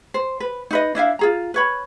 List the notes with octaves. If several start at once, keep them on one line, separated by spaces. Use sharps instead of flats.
C5
B4
D#4 B4 D#5
D4 E4 E5 F5
F4 G#4 A#5
B4 C#5 B5